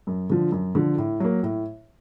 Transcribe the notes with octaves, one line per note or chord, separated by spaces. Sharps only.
F#2
D3 F3
F#2
D3 F3
A2
F#3 A#3
A2